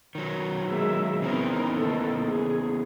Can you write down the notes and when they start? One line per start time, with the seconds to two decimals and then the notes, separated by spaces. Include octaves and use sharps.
0.15 D#3 F#3
0.70 G#3 A#3 E5
1.22 C#3 E3 B3 C4 D#4 A#4
1.74 D#3 A#3 A4
2.27 G#4